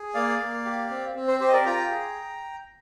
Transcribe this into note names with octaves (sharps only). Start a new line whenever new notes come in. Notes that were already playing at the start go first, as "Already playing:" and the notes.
Already playing: G#4
A#3 D5 F5
A#3
G4
C4
C4
C5
G4 C5
D#5
A#4 D5
F4 G5 A#5
G#4